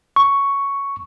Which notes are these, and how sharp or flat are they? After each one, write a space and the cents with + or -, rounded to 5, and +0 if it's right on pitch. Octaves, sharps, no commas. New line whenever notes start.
C#6 +5